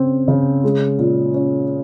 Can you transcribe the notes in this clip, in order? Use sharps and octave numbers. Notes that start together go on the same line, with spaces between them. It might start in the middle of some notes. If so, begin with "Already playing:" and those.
Already playing: C#3 C4
C#3
G#3
A#2
C#4